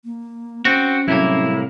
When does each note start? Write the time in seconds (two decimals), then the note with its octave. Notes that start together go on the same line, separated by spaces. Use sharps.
0.04 A#3
0.65 C4 C#4 F#4
1.08 C2 A2 F#3 A#3 E4